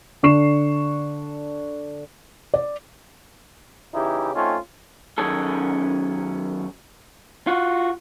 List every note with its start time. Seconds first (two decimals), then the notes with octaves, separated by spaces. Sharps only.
0.23 D3 D4 C#6 C7 E7
2.54 D5
3.94 C#3 E3 D#4 E4 G4
4.34 A3 C4 C#4 D#4 F4
5.18 F#2 D#3 C#4 G#4 A4
7.47 F4 F#4